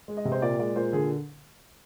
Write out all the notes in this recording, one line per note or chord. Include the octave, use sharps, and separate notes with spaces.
G#3
D#5
C3
C5
A#2 D5
G#3 D5
A#2 C5
D3 G#4